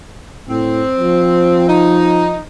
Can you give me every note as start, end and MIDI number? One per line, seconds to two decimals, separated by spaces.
0.49 0.82 45
0.49 1.68 60
1.00 2.38 53
1.69 2.42 63